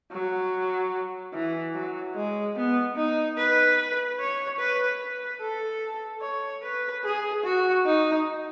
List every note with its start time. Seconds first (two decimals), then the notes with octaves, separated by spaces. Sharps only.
0.12 F#3
1.33 E3
1.74 F#3
2.15 G#3
2.56 B3
2.96 D#4
3.37 B4
4.19 C#5
4.59 B4
5.00 B4
5.41 A4
6.22 C#5
6.62 B4
7.03 G#4
7.44 F#4
7.85 D#4